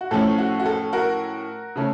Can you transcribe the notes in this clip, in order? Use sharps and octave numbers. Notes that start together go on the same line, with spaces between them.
F#4
A2 F3 A3 C#4 A4
F#4
F#4
A4
F#4 A#4
C#3 A3 C#4